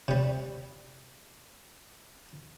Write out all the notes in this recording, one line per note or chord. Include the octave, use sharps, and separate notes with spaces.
C3 G3